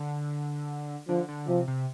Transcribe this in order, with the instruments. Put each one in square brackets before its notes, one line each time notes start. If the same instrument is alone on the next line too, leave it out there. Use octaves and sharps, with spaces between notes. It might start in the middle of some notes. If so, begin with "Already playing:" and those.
Already playing: [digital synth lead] D3
[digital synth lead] D3 [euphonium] F3
[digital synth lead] D3
[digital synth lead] C3 [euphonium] F3
[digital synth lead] C3